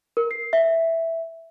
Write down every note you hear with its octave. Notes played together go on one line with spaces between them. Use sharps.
A#4
C7
E5